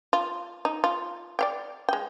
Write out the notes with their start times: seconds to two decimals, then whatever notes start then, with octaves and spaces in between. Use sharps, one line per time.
0.13 F4
0.65 D#4
0.84 F4
1.39 D5 F5 G5
1.89 G#3 G5